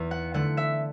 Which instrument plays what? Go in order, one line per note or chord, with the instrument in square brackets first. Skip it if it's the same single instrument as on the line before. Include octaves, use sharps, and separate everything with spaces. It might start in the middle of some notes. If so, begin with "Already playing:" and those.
Already playing: [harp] E2
F#5
D3 A3 F#5
E5